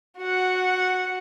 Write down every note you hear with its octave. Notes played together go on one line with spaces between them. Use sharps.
F#4 F#5